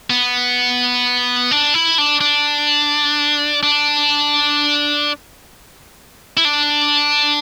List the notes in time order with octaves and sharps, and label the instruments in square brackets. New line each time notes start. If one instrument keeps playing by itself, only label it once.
[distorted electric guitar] B3
D4
E4
D4
D4
D4
E4
D4